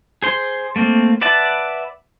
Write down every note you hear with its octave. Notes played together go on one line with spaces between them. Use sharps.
G#4 C5 C6
A3 A#3 C4
B4 D5 E5 F#5 A5